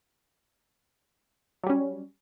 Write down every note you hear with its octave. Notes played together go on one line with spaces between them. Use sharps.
F#3 G3 C#4